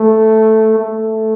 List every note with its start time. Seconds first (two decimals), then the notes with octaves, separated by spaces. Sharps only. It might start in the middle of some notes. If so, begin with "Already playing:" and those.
Already playing: A3
0.79 A3